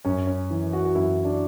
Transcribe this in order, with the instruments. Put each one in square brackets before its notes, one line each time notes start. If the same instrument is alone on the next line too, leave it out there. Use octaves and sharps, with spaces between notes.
[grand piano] F#2 C#4
C#4
E3
F#4
F#4
F#2 E4
D4